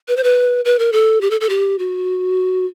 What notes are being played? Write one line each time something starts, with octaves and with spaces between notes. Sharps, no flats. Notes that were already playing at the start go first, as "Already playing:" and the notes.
B4
C5
B4
B4
A#4
A4
G4
A4
A4
G4
F#4